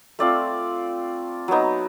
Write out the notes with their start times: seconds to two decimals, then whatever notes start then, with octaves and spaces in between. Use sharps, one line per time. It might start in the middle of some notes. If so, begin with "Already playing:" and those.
0.19 A3 C4 F4 D5
1.48 F#3 B3 D#4